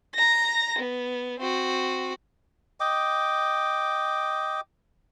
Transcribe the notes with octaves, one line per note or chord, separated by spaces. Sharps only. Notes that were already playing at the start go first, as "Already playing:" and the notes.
A#5 A#6
B3
C4 F#4
D#5 G5 D6